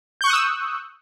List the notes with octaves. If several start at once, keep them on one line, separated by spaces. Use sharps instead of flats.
C#6 D#6 E6 F#6 G6